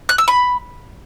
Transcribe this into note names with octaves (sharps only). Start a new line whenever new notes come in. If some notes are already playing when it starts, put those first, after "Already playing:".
F#6
E6
B5